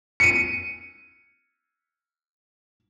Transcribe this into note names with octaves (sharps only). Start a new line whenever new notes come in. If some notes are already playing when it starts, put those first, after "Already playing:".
C#7 D#7